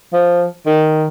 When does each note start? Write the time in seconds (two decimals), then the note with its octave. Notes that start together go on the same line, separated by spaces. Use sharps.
0.13 F3
0.66 D#3